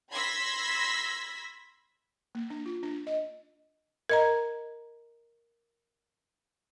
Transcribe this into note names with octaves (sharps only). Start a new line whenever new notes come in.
B5 C6 E6 G#6 A#6 B6
A#3
D4
F4
D4
D#5
A#4 D#5 A#5